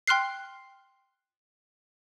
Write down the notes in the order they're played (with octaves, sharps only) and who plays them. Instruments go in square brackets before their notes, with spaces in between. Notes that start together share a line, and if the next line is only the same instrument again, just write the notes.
[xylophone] G5 C6 F6 F#6 C7